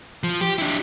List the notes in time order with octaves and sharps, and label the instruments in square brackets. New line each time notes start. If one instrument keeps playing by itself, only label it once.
[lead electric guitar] F3
G4
D4 E4